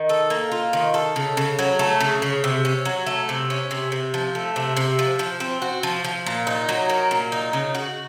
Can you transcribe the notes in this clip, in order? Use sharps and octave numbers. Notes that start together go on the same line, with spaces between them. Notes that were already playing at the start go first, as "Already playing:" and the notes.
Already playing: D#3
A4
A#3
F4
D#3
A4
C#3
C#3
F#3
A3
C#3
C#3
C3
C#4
F#3
A3
C3
C#4
C3
C3
F3
A3
C3
C3
F3
F3
C4
F#4
F3
F3
A#2
D#4
F#3
A#3
A#2
D#4
C#3
F#4